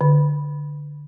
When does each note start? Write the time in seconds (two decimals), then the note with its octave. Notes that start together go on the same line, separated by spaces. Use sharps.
0.01 D3